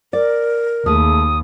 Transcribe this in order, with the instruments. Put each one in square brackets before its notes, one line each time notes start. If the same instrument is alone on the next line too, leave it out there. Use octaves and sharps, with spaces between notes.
[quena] A#4 [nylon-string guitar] D5
[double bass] D#2 [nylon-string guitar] A3 G#4 [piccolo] D#6